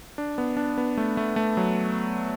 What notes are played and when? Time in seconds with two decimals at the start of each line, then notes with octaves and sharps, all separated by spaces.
0.18 D4
0.38 B3
0.57 D4
0.78 B3
0.97 A3
1.17 A3
1.36 A3
1.57 F#3